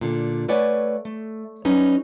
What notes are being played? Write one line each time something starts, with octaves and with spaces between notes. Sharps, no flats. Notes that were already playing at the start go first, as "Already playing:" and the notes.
A#2 D3
A3 B4 C#5 D5 F#5 G#5
A3
F#3 G3 C#4 D#4 B4